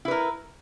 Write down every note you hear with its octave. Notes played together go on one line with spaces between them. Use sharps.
E4 A#4 B4